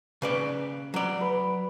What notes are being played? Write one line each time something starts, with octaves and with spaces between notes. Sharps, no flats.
C#3 B4 D5
F#3 D5
B4